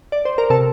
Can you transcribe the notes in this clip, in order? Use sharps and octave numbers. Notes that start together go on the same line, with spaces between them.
D5
C5
A#4
C3 A4